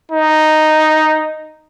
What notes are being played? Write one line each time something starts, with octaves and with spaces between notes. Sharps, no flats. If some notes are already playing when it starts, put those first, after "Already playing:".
D#4